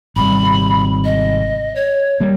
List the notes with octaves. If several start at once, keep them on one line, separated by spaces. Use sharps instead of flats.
G#1 C3 G3 B5
D#5
C#5
G3 A#3